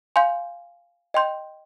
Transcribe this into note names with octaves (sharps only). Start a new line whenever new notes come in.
F5 G#5 C6 G6
D#5 G5 C6 G6